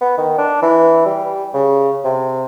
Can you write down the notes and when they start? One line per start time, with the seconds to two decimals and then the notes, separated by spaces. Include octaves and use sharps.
0.01 B3
0.18 D#3
0.38 D4
0.62 E3
1.05 G3
1.53 C#3
2.04 C3